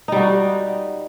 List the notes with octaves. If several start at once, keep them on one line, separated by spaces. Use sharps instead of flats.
G3 D#4 F#4